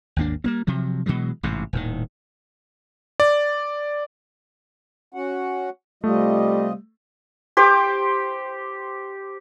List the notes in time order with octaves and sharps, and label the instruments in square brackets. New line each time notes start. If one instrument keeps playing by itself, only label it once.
[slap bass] G#1 D#2 A#3 D4
G3 A#3 C4
C3 F3 F#3
B2 E3 F#3 G#3
A1 G#2 C3
D#1 A2 D#3
[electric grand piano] D5
[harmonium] C#4 F#4 F#5
[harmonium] C3 F4 D#5 [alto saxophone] G3 [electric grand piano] A3
[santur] G4 C5 D6